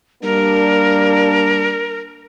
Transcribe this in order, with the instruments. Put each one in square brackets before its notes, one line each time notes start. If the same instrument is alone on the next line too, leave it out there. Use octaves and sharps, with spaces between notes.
[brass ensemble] G3 A#3 D4 [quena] A#4